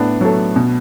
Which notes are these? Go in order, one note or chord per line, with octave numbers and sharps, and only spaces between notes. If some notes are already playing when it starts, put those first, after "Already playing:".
Already playing: A2 B3 D4
F#3 A3
B2